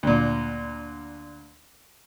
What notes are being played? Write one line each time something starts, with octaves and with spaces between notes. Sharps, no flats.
D2 A#2